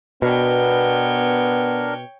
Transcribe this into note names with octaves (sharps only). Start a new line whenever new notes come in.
B2 B3 D4 A#4 C#5 G5